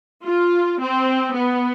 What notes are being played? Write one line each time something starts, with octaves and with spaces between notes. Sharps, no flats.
F4
C4
B3